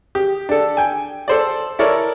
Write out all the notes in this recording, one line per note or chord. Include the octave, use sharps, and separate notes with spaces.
G4
D4 A4
G5 G#5
A4 C5 D5
E4 A4 A#4 C#5 D5